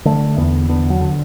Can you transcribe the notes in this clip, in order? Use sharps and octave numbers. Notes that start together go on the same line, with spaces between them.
D3 A3
E2 B3
D3 B3
F#3
D3